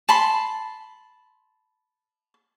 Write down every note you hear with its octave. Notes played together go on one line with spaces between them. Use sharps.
A5 B5 C6